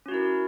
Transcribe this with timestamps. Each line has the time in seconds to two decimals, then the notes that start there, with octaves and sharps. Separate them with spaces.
0.06 C#4
0.08 F#4
0.11 E4
0.14 A#4